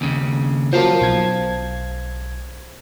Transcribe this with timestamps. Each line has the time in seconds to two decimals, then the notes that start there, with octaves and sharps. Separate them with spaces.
0.01 D#2 C#3
0.73 F3 F#3 A#3 C5 F5 A5
1.01 B1 G#6